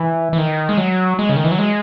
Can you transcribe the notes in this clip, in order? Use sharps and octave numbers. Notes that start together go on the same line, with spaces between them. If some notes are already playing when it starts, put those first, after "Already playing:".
Already playing: E3
E3
D#3
G#3
F#3
G#3
C#3
D#3
E3
F#3
G#3